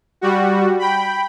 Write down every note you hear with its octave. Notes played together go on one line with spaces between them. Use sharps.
G3 F#4
G5 B5